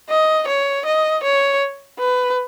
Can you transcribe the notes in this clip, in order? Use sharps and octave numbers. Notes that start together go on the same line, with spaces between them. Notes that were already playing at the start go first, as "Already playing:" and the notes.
D#5
C#5
D#5
C#5
B4